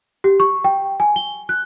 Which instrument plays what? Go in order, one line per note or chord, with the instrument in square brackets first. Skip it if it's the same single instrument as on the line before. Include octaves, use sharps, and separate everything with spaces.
[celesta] G4
C#6
G5
G#5
G7
F#6